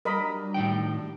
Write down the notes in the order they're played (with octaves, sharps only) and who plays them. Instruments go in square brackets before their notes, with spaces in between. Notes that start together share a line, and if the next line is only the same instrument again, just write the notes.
[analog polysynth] F#3 G3 D4 [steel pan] A#4 D#5 B5
[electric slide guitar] A2 D#3 G5